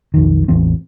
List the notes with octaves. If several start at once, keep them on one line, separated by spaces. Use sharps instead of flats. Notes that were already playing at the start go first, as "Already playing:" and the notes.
B1 F2 D#3
A1 E2 E3 C4